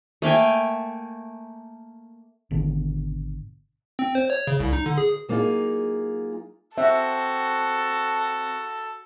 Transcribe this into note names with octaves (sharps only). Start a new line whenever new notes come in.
A3 A#3 G5 G#5
G#1 B2 D3
C4
C5
C#5
C#3
C2
D#4
D3
G#4
F#3 A#3 B3 D#4 F4 G#4
C4 F#4 A4 E5